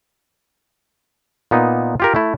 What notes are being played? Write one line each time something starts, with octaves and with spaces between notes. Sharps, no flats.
A#2 B3 D#4
F4 G4 A#4
A3 E4